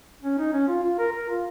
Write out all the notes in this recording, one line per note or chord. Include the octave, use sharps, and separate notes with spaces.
C#4
D#4
C#4
F4
F4
A#4
A#4
F4